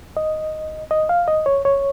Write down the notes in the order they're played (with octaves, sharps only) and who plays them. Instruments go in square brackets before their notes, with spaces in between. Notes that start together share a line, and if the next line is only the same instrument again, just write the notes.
[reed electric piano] D#5
D#5
F5
D#5
C#5
C#5